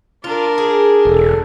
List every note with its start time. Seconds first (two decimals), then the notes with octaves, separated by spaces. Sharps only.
0.24 D4 F4 A#4
0.58 G#4
1.05 E1 A4